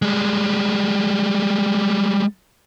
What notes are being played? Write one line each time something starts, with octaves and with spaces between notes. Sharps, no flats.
G3 G#3